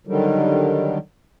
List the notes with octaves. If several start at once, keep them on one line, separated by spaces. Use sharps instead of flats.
D3 D#3 F#3 G3